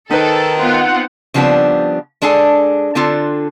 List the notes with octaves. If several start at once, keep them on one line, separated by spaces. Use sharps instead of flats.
D#3 D#4 A4 B4
B3 C4 F4 F#5
C#3 F3 G3 B3 C4 D4
G#3 D4 G#4 A4 G#5
D3 C4 D4 F4 A4